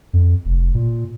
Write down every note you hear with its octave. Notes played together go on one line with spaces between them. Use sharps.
F2
F1
A#2